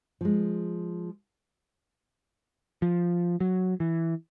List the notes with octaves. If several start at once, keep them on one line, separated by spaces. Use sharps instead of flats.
F3 G#3
F3
F#3
E3